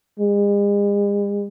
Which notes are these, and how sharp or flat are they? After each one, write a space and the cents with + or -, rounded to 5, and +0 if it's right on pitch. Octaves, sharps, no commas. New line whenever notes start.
G#3 -45